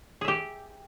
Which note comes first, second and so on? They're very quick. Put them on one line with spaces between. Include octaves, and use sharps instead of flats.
G#4 E5 G4